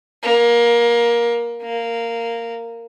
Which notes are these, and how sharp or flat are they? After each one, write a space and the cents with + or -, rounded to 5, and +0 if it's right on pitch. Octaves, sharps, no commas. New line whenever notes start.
A#3 +20
A#3 -10